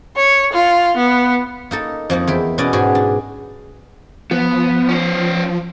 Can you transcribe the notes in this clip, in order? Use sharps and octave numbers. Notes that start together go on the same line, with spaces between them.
C#5
F4
B3
A#3 D#4 A4
F2 F3 A#3 D#4
E2 E4 G5
B2 B3 C#4 D5 D#5
G#2 F#4 G#4 G5
D4
F3 B3
C#4 C5